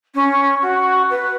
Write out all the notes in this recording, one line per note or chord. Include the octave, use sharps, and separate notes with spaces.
C#4
F#4
B4